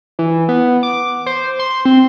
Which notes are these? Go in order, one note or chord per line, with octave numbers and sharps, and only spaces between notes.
E3
B3
D6
C5
C6
C4